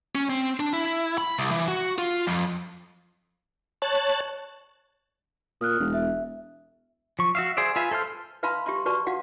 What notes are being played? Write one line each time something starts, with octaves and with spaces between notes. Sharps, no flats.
C#4
C4
D4
E4
B5
C2
E3
F#4
F4
F2
C#5 A5 F#6
A#2 D#6 F6 F#6
E1
E5
F3 C#6
F#4 E5 F5
G#4 C5 D5 E5
F4 B4 E5 G#5
A4 C5 C6 F6
B4 E5 F5 A5 B5 C6
G4 E5 C6
F#4 B4 D5 A5 C#6
F#4 F5 F#5